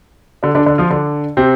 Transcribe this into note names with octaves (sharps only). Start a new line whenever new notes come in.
D3 D4
D3 D4
D3 D4
F3 F4
D3 D4
C3 C4